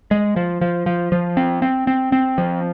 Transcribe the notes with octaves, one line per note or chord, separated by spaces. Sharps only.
G#3
F3
F3
F3
F3
C4
C4
C4
C4
F3